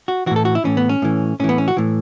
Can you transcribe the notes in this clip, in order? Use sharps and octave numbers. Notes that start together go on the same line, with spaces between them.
F#4
A2 E3 F#4
A4
F#4
E4
A2 E3 C#4
B3
C#4
A2 E3
A2 E3 C#4
B3
C#4
F#4
A2 E3